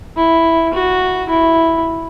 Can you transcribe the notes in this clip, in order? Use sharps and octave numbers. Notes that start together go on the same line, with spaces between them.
E4
F#4
E4